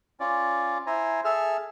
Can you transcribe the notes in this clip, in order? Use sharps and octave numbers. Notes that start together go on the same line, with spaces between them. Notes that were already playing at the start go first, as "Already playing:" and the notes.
C#4 F4 D5
E4 C5 G#5 A#5
G#4 A4 E5 F6